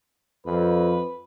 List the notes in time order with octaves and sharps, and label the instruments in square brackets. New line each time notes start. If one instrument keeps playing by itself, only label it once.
[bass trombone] F2 [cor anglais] B4